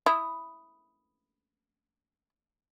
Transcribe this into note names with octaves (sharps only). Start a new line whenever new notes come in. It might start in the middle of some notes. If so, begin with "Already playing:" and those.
E4 B5 D#6